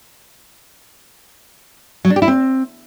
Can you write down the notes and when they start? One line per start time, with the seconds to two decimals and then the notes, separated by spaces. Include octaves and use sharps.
2.05 F#3
2.10 D4
2.16 G4
2.22 E4
2.28 C4